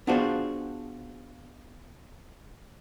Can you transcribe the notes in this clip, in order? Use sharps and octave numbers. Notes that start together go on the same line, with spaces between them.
B3 D4 F4 F#4 G#4 C5